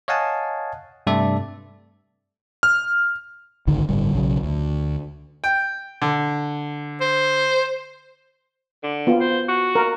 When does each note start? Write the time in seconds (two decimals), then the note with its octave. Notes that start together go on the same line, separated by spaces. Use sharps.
0.08 C#5 D#5 F5 F#5 G#5 A5
1.07 G2 C3 A3 A4 D5 E5
2.63 F6
3.67 G#1 C#2 D3 D#3
3.89 G1 A2 D3 G3
4.14 B1 C#3 F#3
4.43 D2
5.44 G5
6.02 D3
7.01 C5
8.83 D3
9.07 B3 F4
9.20 C5
9.49 F#4
9.75 A#4